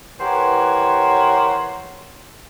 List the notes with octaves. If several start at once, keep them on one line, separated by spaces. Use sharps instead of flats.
E3 G4 A#4 C5 C#5 F#5